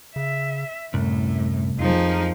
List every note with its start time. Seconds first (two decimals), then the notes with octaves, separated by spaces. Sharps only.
0.16 C#3 E5
0.94 C2 F#2 A2
1.79 F2 F3 D#4 G#4 A#4